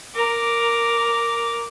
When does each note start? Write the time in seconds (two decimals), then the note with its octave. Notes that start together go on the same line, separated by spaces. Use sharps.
0.15 A#4 D6